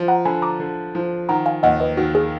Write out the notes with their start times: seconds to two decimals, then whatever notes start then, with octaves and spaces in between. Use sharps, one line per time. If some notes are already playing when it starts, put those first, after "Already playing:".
Already playing: F3
0.08 F#5 A#5
0.25 D3 G#5 B5
0.42 A#5 D6
0.60 D3
0.95 F3
1.29 D#3 F#5 A#5
1.46 F5 G#5
1.63 D#2 D#5 F#5
1.80 B4 D#5
1.97 D#3 F#4
2.15 G#4